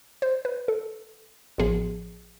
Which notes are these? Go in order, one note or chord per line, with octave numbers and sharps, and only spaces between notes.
C5
B4
A4
A1 A2 F3 B3 G#4